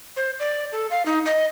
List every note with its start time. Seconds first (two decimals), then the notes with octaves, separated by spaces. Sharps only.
0.17 C5
0.40 D5
0.72 A4
0.91 F5
1.06 D#4
1.25 D#5